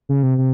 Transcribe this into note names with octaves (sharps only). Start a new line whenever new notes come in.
C#3
C3
C3